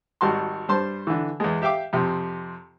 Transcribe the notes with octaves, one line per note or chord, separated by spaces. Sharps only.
G#1 G3 F#4 A5 C6
G2 G3 C5 A5 C6
D3 E3
E2 G#3
G4 E5 F5 G5 D6
F2 C3